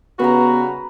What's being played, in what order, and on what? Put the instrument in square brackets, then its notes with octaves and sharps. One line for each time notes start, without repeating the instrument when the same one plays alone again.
[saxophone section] C#3 G3 F#4 [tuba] B3 [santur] B4 A#5